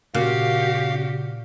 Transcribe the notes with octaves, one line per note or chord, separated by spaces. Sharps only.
A#2 C#3 F#4 G4 F5